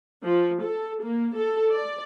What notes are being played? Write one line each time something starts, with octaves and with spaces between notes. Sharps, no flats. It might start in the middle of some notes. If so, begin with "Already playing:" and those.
F3
A4
A#3
A4
D5